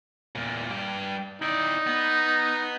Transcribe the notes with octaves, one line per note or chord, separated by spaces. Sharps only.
E2 A#2
G2 G4
D#4 E4 D5
B3